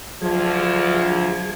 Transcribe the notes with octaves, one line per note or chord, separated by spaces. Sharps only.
D2 F3 F#3 G#4 G#6